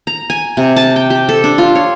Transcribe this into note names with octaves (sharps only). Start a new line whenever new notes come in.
A#5
G#5
C3
A5
G5
G4
A4
D4
F4
C#5